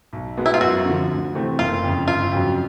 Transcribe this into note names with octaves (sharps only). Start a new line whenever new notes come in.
B1
B2 G#3 B3
E4
F4
F#2 F#4
D3 F3
D2
C3 E3 A3 C4
F#1 F4
F2 C#3
G1 F4
F2 C#3 F#3